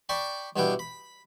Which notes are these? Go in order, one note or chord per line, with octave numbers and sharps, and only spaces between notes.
D5 G5 A5 B5 C#6
G2 B2 B3 D4 E4 G5
B5